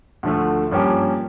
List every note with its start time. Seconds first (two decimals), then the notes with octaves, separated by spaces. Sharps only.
0.23 D2 D3 F3 A3
0.71 G2 F3 A#3 C#4 G4